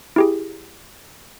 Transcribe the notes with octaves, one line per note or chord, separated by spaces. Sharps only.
E4 G4 G#4